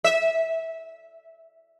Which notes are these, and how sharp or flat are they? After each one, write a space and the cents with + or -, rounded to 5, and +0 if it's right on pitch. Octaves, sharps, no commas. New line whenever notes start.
E5 -15